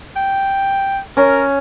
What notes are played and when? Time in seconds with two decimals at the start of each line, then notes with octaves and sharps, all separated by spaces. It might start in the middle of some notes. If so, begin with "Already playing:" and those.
0.16 G5
1.17 C#4 A#4